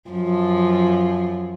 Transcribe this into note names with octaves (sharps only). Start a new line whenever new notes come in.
F#2 F3